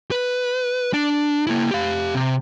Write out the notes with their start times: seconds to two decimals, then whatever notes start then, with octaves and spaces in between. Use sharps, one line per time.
0.11 B4
0.94 D4
1.47 A#3 E4
1.71 G4 F5
2.15 C3